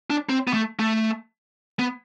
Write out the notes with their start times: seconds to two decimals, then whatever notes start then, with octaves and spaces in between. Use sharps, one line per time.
0.10 D4
0.29 C4
0.47 B3
0.54 A3
0.79 A3
1.79 B3